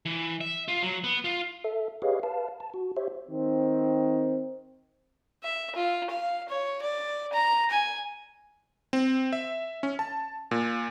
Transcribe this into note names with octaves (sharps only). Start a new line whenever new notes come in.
E3
E5
F4
F#3
B3
F4
A4 E5
G4 G#4 B4 C#5 D#5 F5
B4 F5 A5
A5
F#4
G4 C5 C#5 E5
D#3 C4
E5
F4
F5
C#5
D5
A#5
G#5
C4
E5
C#4
A5
A#2